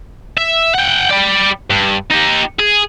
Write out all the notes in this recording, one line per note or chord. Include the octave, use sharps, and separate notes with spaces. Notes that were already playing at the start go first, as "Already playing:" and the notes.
E5
F#5 G5
G3 D5
G2
D#4 G4
G#4